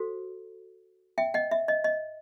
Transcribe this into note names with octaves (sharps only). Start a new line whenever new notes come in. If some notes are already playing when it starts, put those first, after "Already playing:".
Already playing: F#4 A4 C5
E5 G5
D#5 F#5
E5
D#5
D#5